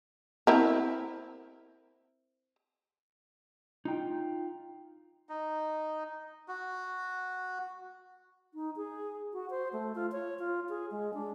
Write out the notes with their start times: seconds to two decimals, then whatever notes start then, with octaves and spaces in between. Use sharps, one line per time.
0.47 C4 E4 A#4
3.85 D#4 F4 G5
5.29 D#4
6.48 F#4
8.54 D#4
8.76 G#4
9.33 F#4
9.50 C5
9.73 A3
9.95 F4
10.12 C#5
10.39 F4
10.69 G#4
10.91 G#3
11.14 D4